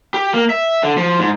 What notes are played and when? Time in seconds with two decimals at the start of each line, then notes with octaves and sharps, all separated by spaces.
0.14 G4
0.34 A#3
0.50 E5
0.83 D3
0.97 F3
1.19 G#2